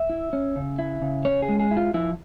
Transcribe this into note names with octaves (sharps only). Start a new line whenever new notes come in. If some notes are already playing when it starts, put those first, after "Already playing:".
Already playing: E5
E4
C#4
C#3
E4
C#3
C#4 C#5
G#4
G#3
G#4
E4
F4
F3 E4